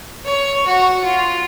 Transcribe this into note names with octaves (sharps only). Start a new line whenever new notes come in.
C#5
F#4
F4